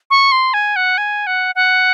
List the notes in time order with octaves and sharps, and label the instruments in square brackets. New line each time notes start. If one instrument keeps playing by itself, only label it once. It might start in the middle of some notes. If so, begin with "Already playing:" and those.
[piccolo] C#6
C6
G#5
F#5
G#5
F#5
F#5